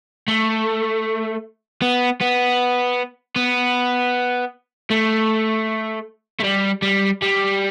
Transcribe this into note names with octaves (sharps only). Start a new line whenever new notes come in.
A3
B3
B3
B3
A3
A3
G3
G3
G3